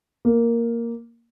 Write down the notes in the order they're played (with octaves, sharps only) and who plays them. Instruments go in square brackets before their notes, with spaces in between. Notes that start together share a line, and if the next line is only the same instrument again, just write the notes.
[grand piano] A#3